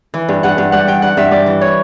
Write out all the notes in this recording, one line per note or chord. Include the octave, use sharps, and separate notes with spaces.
E3
G2
G2 F#5
G2
G3 F#5
G2 G5
G2 F#5
G2 E5
G3 D5
E3
C#5